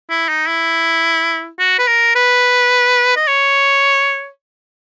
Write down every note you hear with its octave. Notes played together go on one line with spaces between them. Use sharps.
E4
D#4
E4
F#4
B4
A#4
B4
D#5
C#5